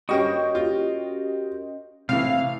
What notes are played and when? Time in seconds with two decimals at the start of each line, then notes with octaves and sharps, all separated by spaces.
0.09 G2 C#4 F#4 G4 A#4 C5 D#5
0.55 F4
2.09 A2 C3 E3 F5